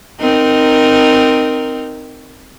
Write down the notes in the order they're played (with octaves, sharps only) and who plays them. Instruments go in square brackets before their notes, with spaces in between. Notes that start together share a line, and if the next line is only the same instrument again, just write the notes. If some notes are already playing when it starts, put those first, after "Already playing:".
[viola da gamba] C4 D#4 A#4